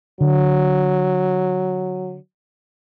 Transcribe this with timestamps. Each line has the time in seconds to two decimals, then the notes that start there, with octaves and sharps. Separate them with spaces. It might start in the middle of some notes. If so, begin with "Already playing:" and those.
0.21 D3 F#3